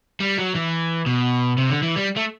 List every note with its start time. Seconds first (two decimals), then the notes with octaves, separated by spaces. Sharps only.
0.20 G3
0.38 F#3
0.55 E3
1.06 B2
1.58 C3
1.70 D3
1.83 E3
1.96 G3
2.17 A3